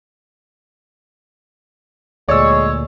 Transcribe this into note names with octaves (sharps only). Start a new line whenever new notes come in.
D2 A#2 G#3 C#5 D5 E6